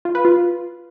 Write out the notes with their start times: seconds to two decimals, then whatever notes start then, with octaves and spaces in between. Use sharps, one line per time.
0.05 F4
0.15 B4
0.25 F4